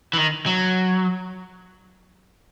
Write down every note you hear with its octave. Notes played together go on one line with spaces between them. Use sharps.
E3
D#3
F#3